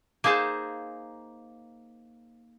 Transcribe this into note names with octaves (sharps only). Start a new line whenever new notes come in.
A#3 D#4 G#4 C5 A5